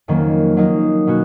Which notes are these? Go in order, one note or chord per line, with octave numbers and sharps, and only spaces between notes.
F2 D#3 F#3 A#3 C#4
F#3 A#3 D#4
B2 A#3 C#4 F#4